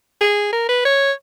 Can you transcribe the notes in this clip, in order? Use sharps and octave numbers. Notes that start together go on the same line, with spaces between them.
G#4
A#4
B4
C#5